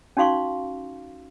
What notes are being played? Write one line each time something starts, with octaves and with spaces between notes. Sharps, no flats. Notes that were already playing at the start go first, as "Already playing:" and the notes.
C#4 D#4 F#4 F5 C6 C#6